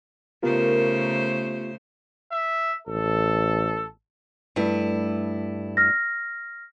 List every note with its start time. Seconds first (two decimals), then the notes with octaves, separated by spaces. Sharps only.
0.43 C#3 A3 B3 F4 G4 A#4 C5
2.32 E5
2.87 A1 A4
4.56 G2 A3 E4
5.77 F6 A#6